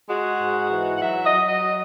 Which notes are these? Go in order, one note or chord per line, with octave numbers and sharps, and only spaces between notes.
G#3 F#4
G#2
E3
F#5
F#3 E5
D#5
F#3
D#5